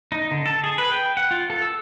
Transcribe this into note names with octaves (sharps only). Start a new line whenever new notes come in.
D#4
D3
A4
G#4
B4
G5
F#5
F4
A4
E6